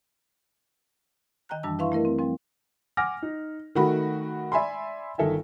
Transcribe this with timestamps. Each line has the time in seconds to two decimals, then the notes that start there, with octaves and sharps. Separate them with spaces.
1.49 D#3 D#5 G5 G#5 A#5 F#6
1.63 F#2 E3 G3 D4 A5 E6
1.79 E4 B4 E5 F5 C6 C#6
1.92 A3 E4 A#4 D#5
2.05 C4
2.19 F3 G3 C4
2.97 F#5 G#5 D6 F6 A#6
3.22 D#4
3.75 D#3 A3 F#4 B5
4.52 D5 E5 G#5 B5 C6
5.18 G1 D#3 A4 E5 G#5